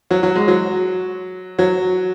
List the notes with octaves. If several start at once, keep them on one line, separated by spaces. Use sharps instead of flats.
F#3
F#3
G#3
F#3
F#3